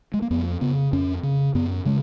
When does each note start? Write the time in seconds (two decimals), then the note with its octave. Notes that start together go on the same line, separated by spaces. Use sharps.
0.14 G#3
0.22 A#3
0.31 F2 B3
0.61 C#3 B3
0.93 F2 C#4
1.23 C#3
1.55 F#2 B3
1.85 C#3 G#3